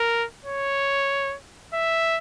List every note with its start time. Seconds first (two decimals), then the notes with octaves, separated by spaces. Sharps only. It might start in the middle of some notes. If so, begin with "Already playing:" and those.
Already playing: A#4
0.45 C#5
1.74 E5